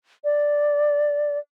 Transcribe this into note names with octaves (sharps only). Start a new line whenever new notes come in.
D5